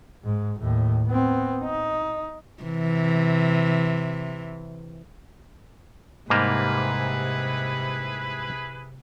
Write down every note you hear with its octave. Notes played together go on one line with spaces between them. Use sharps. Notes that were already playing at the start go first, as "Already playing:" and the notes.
G#2
D#2 A2
B3 C4
D#4
C3 E3
G#2 C3 G3 A#3 E4 G#4 B4